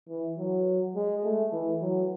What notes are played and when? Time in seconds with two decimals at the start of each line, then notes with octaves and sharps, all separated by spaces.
0.09 E3
0.38 F#3
0.95 G#3
1.24 A3
1.53 E3
1.82 F#3